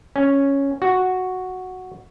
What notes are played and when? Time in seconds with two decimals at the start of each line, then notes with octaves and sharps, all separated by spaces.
0.16 C#4
0.82 F#4